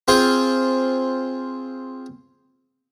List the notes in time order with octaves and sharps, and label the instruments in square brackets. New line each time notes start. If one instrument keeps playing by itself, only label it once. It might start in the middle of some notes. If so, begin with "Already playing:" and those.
[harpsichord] C4 F4 G#4 C5